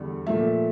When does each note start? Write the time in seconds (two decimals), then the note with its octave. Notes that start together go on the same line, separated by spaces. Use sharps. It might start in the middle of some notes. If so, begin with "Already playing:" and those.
Already playing: E2 D3 G3
0.26 A#2 F3 A3 E5